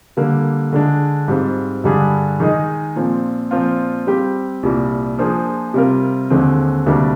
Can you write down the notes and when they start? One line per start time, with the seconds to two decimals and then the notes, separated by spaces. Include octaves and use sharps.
0.17 D3 G3 A#3
0.73 D3 G#3 D4
1.28 G#2 G3 C4 F4
1.84 G2 D3 G3 D4 G#4
2.40 D#3 G#3 D#4 G#4 D#5
2.96 A#2 F3 C4
3.51 A#2 F3 C4 F4
4.07 G3 C4 G4
4.63 C2 A#2 G3
5.19 F3 A#3 D4 G#4 C5
5.74 C3 G3 C4 F4 A#4
6.30 D#2 D3 G#3 C4
6.86 D2 C3 G3 A#3 D4